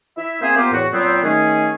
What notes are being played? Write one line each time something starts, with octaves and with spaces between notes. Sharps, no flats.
E4 E5
A#3 C4 G#4 C5 E5
A#3 B3 F4 G4 C5
E2 A2 F#4
A#2 F#3 B3 C4
D#3 A3 C#4 G#4